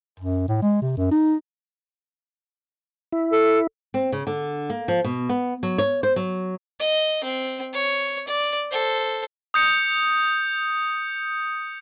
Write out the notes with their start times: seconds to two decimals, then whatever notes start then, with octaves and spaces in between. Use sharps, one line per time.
0.20 F#2
0.48 A2
0.62 G#3
0.82 C3
0.97 F#2
1.11 D#4
3.13 E4
3.32 A4
3.94 C4
4.12 C#3
4.27 D3
4.70 A#3
4.88 F3
5.04 B2
5.29 B3
5.63 F#3
5.78 C#5
6.03 C5
6.16 F#3
6.79 D#5
7.24 C4
7.73 C#5
8.28 D5
8.71 A4 C5
9.54 D#6 G6 C#7